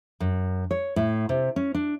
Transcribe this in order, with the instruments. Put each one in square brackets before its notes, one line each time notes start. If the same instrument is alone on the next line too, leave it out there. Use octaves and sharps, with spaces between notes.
[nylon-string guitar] F#2
C#5
A2
C3
C#4
D4